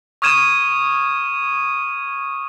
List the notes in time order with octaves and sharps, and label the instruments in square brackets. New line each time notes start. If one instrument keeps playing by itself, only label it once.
[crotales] C#6 D#6 F6 G#6 D#7 E7